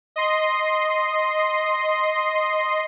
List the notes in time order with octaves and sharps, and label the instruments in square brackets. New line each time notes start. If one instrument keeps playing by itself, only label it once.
[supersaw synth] D#5 C6